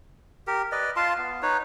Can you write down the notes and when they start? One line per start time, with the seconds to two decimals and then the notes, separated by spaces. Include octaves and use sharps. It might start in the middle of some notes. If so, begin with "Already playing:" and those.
0.47 G4 A#4
0.72 B4 D5 D#5
0.96 F4 F5 A5 C6
1.18 B3
1.42 D#4 B4 C#5